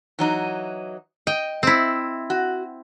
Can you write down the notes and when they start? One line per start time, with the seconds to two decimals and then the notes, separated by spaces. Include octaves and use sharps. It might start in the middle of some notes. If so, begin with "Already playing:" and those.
0.19 E3 F#3 D#4
1.27 D#5 G5
1.63 C4 E4
2.30 F#4